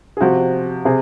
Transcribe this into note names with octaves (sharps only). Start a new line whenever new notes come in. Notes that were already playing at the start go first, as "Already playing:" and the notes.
G#4
C3 F3 F#4
C3 G#4